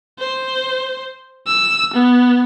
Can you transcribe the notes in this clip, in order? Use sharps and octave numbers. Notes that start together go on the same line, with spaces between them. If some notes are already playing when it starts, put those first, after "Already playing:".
C5
E6
B3